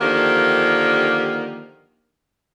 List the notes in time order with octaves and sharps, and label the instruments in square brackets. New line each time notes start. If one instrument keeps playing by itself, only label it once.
[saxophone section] D3 D#3 F3 A#3 D4 G4